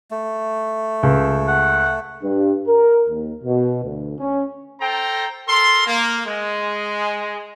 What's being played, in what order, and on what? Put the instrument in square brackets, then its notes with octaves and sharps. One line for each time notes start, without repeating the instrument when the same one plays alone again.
[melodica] A3
[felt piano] C#2
[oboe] F#5
[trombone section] G2
A#4
D#2
B2
D2
C#4
[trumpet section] A4 C5 G5 A#5
A4 A#4 C6
A#3
G#3